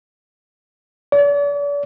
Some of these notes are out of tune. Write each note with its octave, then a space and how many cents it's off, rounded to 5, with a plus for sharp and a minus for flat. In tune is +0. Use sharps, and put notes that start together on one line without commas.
D5 -40